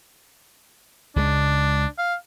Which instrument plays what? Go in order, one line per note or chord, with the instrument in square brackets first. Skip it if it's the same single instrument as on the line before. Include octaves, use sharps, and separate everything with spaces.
[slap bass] C#2 C#3 G#3 [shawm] D4
[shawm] F5